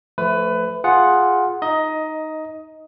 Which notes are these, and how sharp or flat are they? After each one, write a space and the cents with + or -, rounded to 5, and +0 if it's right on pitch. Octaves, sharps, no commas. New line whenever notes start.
F3 +0 A3 +0 B4 +20
F4 +5 G#4 +0 F#5 +0
D#4 +0 D#5 +15